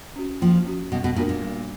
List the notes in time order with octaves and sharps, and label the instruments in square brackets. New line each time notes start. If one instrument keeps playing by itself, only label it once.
[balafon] C#4 F#4
[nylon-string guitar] F3 [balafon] A#3
[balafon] C#4 F#4
[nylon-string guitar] B2 [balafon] G3
[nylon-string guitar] B2
[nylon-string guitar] A#2 [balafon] A#3 D4 F#4 A#4
[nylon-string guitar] A#2
[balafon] G3